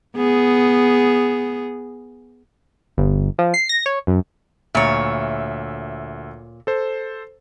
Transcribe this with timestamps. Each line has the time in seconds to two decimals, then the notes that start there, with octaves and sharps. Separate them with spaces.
0.17 B3 G#4
2.97 G1
3.39 F3
3.54 C7
3.69 A#6
3.86 C#5
4.07 F#2
4.75 D2 A#2 C#5 E5
6.67 A4 C5